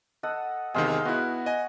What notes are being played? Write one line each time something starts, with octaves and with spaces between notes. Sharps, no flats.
A4 D#5 F#5
E2 C3 D#3 G#3 F5
B3 E4 F#4 F#5
D#5 G#5